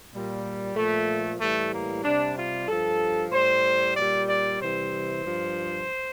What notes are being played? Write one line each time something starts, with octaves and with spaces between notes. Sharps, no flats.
A#2 G3
A#2 F3 A3
A2 E3 G3 A3
A#3
C3 G3 D4
F4
G2 F3 A4
A2 G3 C5
A#2 G3 D5
D5
C3 E3 G3 C5
G2 F3